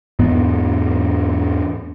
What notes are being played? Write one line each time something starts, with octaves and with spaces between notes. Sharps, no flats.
E2 G#2 B3